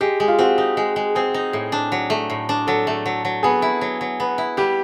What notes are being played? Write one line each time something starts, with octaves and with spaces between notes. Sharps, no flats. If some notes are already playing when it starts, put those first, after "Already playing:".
G#3 G4
G#3
F4
C4 F#4
D#4
G#3
G#3
C4 G#4
D#4
A2
D4
F#3
A3
A2
D4
F#3 A4
A3
F#3
F#3
B3 G#4
E4
F#3
F#3
B3
E4
G3 G4